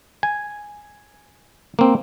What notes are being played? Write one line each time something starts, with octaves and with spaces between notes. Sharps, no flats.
G#5
A#3 C4